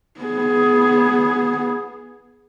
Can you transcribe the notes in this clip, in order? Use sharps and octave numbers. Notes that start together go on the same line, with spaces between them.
B3 G#4